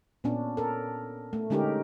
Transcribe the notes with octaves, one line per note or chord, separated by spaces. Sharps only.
A#2 B3 C#4 D4
A4 A#4
A3
D3 G#3 C#4 D#4 G4 A#4